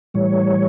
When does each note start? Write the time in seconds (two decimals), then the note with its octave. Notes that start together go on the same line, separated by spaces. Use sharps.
0.14 A2 E3 G3 C#5